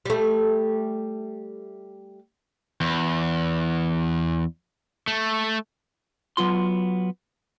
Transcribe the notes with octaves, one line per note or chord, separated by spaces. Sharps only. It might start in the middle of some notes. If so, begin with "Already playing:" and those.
G3 A3
E2
A3
F#3 B3 F4 C6